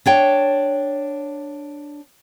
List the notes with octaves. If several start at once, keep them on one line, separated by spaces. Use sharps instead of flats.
D4 C#5 G5